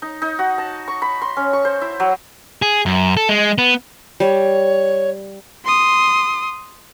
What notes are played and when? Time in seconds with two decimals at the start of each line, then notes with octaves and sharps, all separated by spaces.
0.02 D#4
0.22 D#4
0.39 F#4
0.58 A5
0.88 C#6
1.02 B5
1.22 C6
1.37 C#4
1.53 C#6
1.65 C5
1.81 E4
2.00 F#3
2.62 G#4
2.86 F#2
3.17 A4
3.29 G#3
3.58 B3
4.20 G3 C#5
5.65 C6 D#6